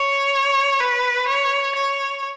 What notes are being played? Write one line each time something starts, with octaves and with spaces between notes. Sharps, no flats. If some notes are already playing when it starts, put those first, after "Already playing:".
Already playing: C#5
B4
C#5
C#5